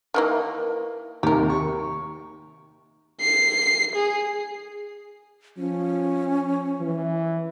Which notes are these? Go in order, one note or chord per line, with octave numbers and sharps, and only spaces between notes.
D#3 E3 A#3
D#2 C3 G4 A#4
C#6
C7
G#4
F3 C#4
E3